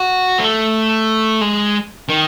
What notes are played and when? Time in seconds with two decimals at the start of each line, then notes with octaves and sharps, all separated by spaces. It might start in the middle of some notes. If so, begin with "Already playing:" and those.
Already playing: F#4
0.39 A3
1.41 G#3
2.09 D#3